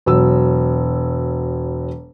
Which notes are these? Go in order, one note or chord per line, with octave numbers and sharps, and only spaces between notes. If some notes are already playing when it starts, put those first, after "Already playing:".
E1 F#3 E6